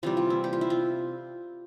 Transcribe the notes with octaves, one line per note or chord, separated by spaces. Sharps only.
C3 E3 G3 F4
F4
E4
G4
F4
E4
F4